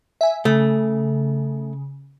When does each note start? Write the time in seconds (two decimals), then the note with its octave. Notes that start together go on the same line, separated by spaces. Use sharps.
0.21 E5 G#5
0.45 C#3 A3